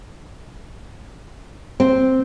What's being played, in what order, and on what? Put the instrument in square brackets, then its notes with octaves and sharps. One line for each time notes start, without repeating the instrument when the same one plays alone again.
[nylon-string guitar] C4